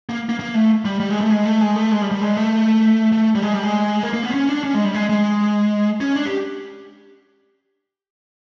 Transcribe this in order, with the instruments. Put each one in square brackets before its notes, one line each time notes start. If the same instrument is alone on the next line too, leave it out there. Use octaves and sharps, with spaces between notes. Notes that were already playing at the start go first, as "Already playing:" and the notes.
[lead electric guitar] A#3
A#3
A#3
A3
G3
G3
G#3
A3
G#3
A3
G#3
A3
G#3
G3
G3
G#3
A3
A3
G3
G#3
G3
G#3
A#3
A#3
B3
C4
C#4
D4
C#4
G#3
G3
G#3
G#3
C#4
D4
G4